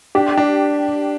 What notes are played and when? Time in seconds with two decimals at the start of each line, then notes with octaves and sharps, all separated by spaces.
0.15 D4 G4
0.38 D4